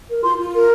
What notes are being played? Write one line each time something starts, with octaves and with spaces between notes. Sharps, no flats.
A#4
F4 C6
F4
A#4